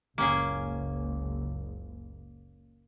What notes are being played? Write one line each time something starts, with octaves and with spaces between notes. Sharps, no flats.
F#1 C#2 A#3 C#4 G#4